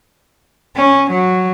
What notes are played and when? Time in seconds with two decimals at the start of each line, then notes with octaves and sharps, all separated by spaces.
0.76 C#4
1.09 F#3